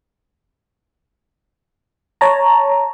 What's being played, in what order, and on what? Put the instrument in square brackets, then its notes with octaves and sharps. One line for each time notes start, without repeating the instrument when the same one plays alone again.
[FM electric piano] C#5 A5 A#5